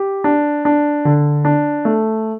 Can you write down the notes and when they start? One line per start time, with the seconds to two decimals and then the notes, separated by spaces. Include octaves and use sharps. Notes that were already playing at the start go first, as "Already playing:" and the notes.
Already playing: G4
0.24 D4
0.65 D4
1.05 D3
1.45 D4
1.85 A3